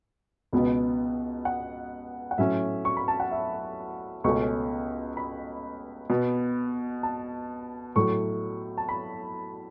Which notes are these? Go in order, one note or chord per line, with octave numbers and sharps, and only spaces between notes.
C#2 B2 B3
F#5
F#5
A2 F#3 A3 C#4 E5
C#6
B5
A5
F#5
E5
C#2 B2 A3 C#4 C#6
B5
B2 B3 B5
A5
A2 F#3 A3 C#6
A5
B5